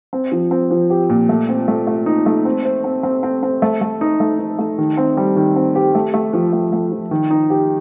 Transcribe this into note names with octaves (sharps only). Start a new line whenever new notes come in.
C4
F3
C4
F3
G4
A#2
A3
C4
A3
A3
D#4
A3
C4
C5
C4
C4
C4
C4
A3
A3
D#4
A3
D#4
A3
D#3
C4
G3
D#3
C4
G4
A3
A3
F3
A3
A3
F3
D#3
D#4
G4